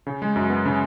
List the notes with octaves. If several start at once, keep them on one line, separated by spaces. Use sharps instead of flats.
C#3
G#3
F#2
B3
C#3